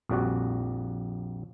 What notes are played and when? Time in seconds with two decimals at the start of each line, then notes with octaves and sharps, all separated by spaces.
0.09 A#1 F2 G3 F#4 D5